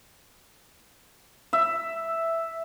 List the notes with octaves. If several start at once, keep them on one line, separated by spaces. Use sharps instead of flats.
E5